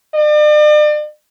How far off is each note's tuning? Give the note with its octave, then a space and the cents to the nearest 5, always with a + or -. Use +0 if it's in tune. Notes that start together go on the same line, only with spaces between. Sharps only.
D5 +40